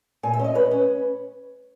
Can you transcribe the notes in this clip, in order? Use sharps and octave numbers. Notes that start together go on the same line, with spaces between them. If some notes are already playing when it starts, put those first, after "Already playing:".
A#2 G#5
E5
C#4 D#5
C#4 B4
C#4